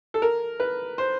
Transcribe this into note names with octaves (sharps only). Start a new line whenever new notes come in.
A4
A#4
B4
C5